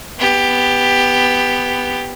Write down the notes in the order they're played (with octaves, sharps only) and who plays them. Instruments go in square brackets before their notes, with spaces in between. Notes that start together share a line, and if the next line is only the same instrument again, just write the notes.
[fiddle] B3 G4